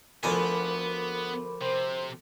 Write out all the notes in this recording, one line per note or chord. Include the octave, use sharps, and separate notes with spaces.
D2 F3 B3 A#4 G#5 B5 D6
C3 C5